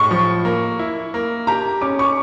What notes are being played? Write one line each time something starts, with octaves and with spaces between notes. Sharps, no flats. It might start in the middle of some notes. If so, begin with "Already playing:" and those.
Already playing: A2 C#6
F3
A#3
E4
A#3
G4 A#5
C#4 D6
C#6